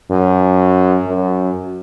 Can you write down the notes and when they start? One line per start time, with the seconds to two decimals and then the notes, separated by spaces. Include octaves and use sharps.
0.11 F#2
1.07 F#2